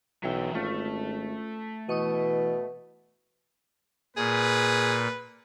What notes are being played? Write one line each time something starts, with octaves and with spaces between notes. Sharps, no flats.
B1 E3 F#3 E5 G5
G#1 A3 C#4 F4
B2 E3 D#5 C#6 D#6
A#2 G#4 B4